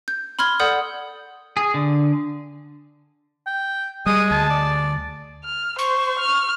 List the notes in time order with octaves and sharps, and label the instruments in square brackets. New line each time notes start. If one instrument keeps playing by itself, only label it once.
[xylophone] G6
B5 C6 F6 G#6 G7
A4 D5 F#5 D#6 G6
[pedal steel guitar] G#4
D3
[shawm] G5
[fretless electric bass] G3 [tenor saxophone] G#3 [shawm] D#6
[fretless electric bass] D2 [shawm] A5
[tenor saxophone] D5
[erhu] F6
[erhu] C5 [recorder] C#6
[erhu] F6